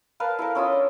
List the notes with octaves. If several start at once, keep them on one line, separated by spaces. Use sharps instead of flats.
A#4 B4 F5 A5
E4 A4 A#4
C#4 E4 F4 D#5
D4